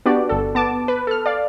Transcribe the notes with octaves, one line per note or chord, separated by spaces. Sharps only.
B3 D4 F#4 G4 D5
G1 A4
B3 A5 D6
B4
A4 F6
D5 F5